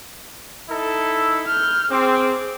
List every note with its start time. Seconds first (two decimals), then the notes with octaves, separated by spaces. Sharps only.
0.69 D#4 E4 A4
1.47 F6 G6
1.91 C4 G#4 D6